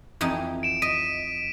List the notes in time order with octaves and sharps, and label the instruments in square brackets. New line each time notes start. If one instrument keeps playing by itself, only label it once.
[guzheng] F2 E3 D#4
[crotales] D7 E7
[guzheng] D#5 [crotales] B6 D#7